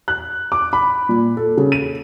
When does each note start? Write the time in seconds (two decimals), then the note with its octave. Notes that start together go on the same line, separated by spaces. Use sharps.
0.08 F#6
0.52 D6
0.73 B5
1.09 A#2
1.37 A4
1.57 C#3
1.72 D#7